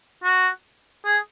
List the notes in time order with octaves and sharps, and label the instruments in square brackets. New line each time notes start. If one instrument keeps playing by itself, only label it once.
[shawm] F#4
G#4